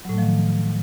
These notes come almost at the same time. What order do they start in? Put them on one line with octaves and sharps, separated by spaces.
F#3 A2 A3 F3 D#3